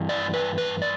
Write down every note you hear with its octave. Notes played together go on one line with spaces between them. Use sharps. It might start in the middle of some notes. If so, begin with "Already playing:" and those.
Already playing: G2 E3
D5
B4
B4
D5